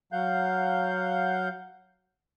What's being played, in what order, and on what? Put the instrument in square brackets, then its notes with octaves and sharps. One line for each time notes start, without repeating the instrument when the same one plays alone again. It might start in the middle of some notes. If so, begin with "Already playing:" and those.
[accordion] F#3 F5 F#5 G6